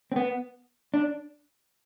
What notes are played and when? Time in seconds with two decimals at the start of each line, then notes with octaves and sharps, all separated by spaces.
0.12 C4
0.16 B3
0.94 D4